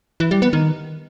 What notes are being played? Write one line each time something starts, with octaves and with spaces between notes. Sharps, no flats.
E3
G3
B3
D#3